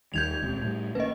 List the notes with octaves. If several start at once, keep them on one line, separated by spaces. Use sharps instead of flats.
D#2 D#3 G3 G6 G#6 F7
D#1 C#2 C3
A2 G3
A1 A#3 C#4 B4 D#5